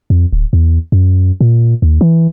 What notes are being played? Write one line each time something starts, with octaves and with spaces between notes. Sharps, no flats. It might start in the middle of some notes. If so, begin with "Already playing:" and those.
F2
D1
E2
F#2
A#2
D#2
E3